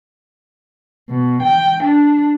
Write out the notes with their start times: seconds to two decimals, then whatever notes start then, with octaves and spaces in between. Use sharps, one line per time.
1.10 B2
1.43 G5
1.83 D4